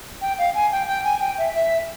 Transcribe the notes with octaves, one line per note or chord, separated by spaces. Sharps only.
G5
F5
G#5
G5
G5
G#5
G5
E5
E5